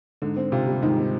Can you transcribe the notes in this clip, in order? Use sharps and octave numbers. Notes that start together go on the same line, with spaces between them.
G#2 D3
C4
C3 F4
G3
G#2 D#3
C4